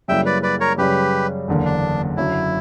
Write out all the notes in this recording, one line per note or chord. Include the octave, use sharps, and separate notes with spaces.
F#2 C#3 G3 A#3 E4 E5 G5
B4 D5
B4 D5
A#4 C#5
F#2 C#3 G3 G4 B4
F#1 E2 D3 A#3
D4
F#1 F#2 D3 F#3 E4